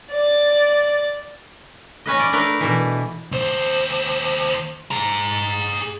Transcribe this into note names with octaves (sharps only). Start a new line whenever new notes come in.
D5
C#4 B4 D#5
D5
A3 D4 A#4 B4
B2 E3
D#2 C5
G#4 A#5